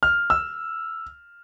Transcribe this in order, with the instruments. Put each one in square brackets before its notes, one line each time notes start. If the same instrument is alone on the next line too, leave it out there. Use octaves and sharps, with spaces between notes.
[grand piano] F6
E6